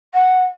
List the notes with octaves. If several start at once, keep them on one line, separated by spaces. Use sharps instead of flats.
F#5